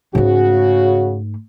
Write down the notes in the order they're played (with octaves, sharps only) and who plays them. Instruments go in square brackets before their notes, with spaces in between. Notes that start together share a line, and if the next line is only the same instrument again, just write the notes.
[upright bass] G#2 A3 [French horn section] C#3 F#4